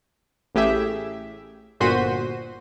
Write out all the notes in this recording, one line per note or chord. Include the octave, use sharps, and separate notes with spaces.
A1 A2 G4 G#4 E5
G1 A#2 F#4 C5 B6 D#7